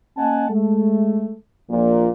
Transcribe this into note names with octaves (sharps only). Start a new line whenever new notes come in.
A#3 C#4 D#5 F#5 G#5 A5
G#3 A3
A#1 A#2